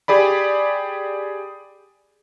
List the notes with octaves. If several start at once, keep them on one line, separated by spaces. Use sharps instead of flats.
G4 G#4 D5 B5